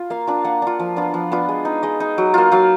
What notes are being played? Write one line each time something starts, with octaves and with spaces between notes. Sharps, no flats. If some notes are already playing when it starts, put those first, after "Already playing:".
Already playing: F4
A#3 F5
D4 F4
A#3 F#5
D4 F4
F3
B3 D4 F4
F3
B3 D4 F4
G#3
D#4
G#3 D#5
D#4
F#3
A#3 F4
F#3 F5